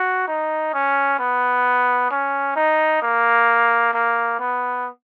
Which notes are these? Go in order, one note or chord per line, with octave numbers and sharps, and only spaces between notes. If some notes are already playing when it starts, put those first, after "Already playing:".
Already playing: F#4
D#4
C#4
B3
C#4
D#4
A#3
A#3
B3